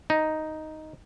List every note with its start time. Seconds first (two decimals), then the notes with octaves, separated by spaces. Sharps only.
0.10 D#4